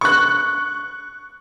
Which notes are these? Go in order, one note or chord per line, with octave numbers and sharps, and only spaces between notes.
C#6 F#6